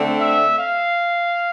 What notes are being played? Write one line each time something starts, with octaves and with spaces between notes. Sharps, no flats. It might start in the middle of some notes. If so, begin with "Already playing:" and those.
Already playing: D3 A3 C4
E5
F5